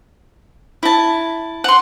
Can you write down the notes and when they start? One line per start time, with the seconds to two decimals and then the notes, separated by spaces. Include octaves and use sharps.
0.83 E4 A5
1.64 F#5 C6